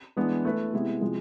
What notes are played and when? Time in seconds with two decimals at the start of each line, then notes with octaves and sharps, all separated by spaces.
0.17 E3 G#3 B3 D4 G#4
0.45 A3 E4 B4
0.73 C3 G#3 B3 E4
1.01 C3 F3 G#3